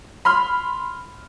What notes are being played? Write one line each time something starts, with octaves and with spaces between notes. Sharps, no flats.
B5 C6 F6